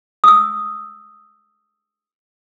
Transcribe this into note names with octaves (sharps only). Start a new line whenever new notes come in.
D#6 E6